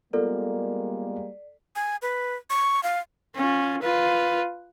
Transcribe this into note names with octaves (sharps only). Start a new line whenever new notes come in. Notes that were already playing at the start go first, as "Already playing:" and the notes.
G3 G#3 A#3 B3 F4 A4 A#4 D5
G#5
B4
C#6
F5
C#4 F4
F4 B4